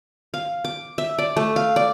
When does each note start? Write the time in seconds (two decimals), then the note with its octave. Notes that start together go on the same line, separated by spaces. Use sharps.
0.34 F5
0.65 D6
0.98 E5
1.18 D5
1.37 A3
1.56 F5
1.76 D5